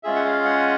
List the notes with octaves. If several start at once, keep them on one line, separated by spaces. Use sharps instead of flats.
G#3 C#4 F4 G#4 E5
F#5
F5
F#5